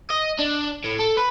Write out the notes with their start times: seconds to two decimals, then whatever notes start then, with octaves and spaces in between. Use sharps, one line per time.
0.10 D#5
0.39 D4
0.84 A2
0.99 A4
1.17 B4